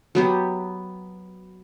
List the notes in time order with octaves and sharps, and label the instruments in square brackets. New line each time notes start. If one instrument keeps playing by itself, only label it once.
[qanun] F#3 B3 G4